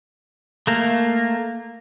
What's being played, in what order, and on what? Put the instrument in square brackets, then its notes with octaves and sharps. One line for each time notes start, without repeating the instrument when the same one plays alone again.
[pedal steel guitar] A3 A#3